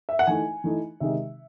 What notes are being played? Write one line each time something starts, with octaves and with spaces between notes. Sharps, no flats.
E5
F#5
E3 A3 D#4 G#5
E3 A3 D#4
C3 D#3 G#3 D#4 E5